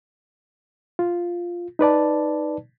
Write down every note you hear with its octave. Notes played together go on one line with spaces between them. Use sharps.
F4
D#4 B4 D5 A5